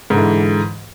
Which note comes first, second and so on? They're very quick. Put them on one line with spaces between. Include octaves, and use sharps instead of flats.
G#2 D3 E3